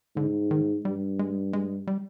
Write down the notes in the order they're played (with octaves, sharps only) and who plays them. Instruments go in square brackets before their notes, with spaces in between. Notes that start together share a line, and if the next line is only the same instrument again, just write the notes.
[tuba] G#2 [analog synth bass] D3
[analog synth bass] D#3
[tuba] G2 [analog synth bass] G3
[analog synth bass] G#3
G#3
G3